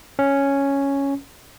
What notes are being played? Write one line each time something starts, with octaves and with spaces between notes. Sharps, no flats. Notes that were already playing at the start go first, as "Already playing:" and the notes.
C#4